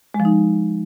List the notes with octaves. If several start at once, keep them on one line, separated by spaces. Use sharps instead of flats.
G#3
F3
D#4